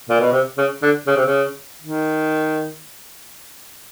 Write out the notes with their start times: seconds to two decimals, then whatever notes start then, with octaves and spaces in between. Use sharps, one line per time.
0.09 A#2
0.21 B2
0.32 C3
0.58 C#3
0.82 D3
1.07 C#3
1.16 C3
1.26 C#3
1.82 D#3